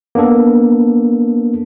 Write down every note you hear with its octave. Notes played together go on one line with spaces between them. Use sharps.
A#3 B3 D4 A4